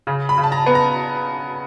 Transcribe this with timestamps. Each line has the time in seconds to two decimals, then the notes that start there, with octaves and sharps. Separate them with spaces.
0.07 C#3
0.29 B5
0.38 C#3
0.44 A5
0.52 A#5
0.66 B3
0.75 A#5